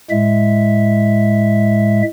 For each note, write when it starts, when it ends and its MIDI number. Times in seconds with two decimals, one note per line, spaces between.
0.10 2.02 45
0.10 2.02 56
0.10 2.02 76